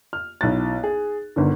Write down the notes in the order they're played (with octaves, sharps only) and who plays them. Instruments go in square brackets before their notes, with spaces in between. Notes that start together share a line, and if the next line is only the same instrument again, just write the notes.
[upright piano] F6
B1 E4 F#6 A6
G#4
G1 D3 D#3